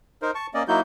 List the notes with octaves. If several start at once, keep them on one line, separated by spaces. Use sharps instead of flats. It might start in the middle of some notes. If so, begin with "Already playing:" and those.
D#4 A#4 C5
A5 C#6
A#3 C#4 D5 D#5
F#3 A#3 D#4 E4 F#4 G6